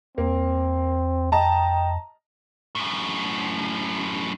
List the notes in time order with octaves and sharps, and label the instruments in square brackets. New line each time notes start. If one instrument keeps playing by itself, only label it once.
[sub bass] E2 [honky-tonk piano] A#3 [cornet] C4
[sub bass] F2 [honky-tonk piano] D#5 A5 A#5 [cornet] G5
[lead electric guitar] F#2 A2